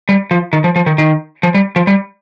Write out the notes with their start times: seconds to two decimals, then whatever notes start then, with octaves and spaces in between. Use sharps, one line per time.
0.09 G3
0.31 F3
0.53 D#3
0.64 F3
0.76 F3
0.86 D#3
0.98 D#3
1.43 F3
1.54 G3
1.76 F3
1.87 G3